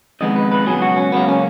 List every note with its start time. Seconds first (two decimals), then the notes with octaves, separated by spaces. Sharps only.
0.21 F2 D#3 G#3 B3 D#5
0.36 B4
0.52 B4
0.66 C#2 B2 F#3 B3 G#4
0.82 F#4
0.97 C#4
1.12 C#2 C#3 F#3 A#3 B3
1.29 C#4